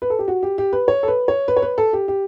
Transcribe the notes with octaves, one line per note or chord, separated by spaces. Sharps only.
B4
A4
G4
F#4
G4
G4
B4
C#5
A4
B4
C#5
B4
C#5
B4
A4
G4
G4